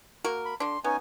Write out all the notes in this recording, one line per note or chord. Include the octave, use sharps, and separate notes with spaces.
A#3 F#4 A#4
B5
D3 D4 C6
B3 C#4 D#4 G#5